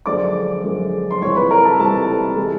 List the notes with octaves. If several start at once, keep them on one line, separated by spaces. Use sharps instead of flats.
F#2 D3 F3 G#3 D5 D6
F#2 D3 F3 G#3
C6
C#2 C3 E3 G3 C#5 C#6
B4 B5
A#4 A#5
A4 A5
C#2 C3 E3 G3 A4 A5
E3 G#3